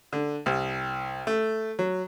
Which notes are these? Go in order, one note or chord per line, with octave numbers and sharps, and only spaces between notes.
D3
C2
A3
F#3